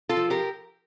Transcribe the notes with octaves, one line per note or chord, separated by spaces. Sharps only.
F4 A4
F3
G4 A#4